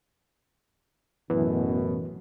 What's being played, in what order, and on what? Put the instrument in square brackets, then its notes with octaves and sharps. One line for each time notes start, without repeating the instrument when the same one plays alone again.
[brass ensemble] A1 F#2 B2 [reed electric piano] E3 B3